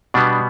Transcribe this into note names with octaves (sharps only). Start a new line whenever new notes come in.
B2 G3 B3 D4